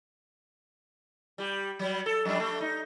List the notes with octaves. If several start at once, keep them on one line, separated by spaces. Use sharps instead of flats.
G3 G4
F#3 G3
A4
F2 G3 D4
A3 D4
D#4